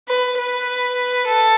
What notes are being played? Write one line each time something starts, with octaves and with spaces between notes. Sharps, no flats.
B4
B4
A4